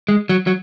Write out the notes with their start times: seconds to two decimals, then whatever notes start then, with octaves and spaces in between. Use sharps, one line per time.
0.08 G#3
0.29 F#3
0.47 F#3